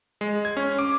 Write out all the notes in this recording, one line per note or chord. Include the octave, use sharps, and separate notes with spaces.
G#3
G#6
C#4
D6